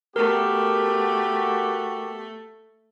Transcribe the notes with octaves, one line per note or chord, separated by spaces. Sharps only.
A3 B3 F#4 G4 A#4